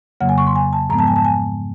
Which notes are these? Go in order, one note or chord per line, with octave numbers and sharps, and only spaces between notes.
F2 C#3 F#3 A#3 F#5
G#5
C#6
C6
G#5
A5
G#2 F3 G#3 B3 A#5
A5
G#5
A5
G#5